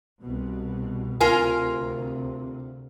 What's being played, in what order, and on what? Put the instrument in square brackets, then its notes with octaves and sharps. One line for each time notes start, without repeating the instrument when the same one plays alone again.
[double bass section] C2 B2
[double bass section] D2 C3 [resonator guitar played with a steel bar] F4 A#4 G#5